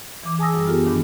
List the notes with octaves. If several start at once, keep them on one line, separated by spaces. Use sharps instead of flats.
E3 D6
G#4 G#5 A5 D#6 E6 A#6
F#2 G3
B3 F4 G4 A4
G2 D#3 D4